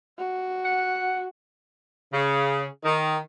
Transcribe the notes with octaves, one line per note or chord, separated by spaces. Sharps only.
F#4
F#5
C#3
D#3